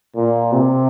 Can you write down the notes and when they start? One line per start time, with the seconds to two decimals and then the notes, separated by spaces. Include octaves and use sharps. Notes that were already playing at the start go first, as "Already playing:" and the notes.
0.16 A#2
0.52 C3